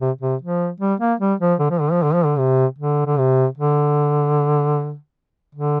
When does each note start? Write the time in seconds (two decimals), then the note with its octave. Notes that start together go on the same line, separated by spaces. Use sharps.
0.01 C3
0.21 C3
0.41 F3
0.80 G3
1.00 A#3
1.20 G3
1.40 F3
1.59 D3
1.70 F3
1.80 D3
1.91 F3
2.03 D3
2.14 F3
2.25 D3
2.38 C3
2.78 D3
3.06 D3
3.18 C3
3.57 D3
5.55 D3